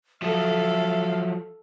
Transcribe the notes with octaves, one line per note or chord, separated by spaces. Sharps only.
F3 F#3 A4 E5 F5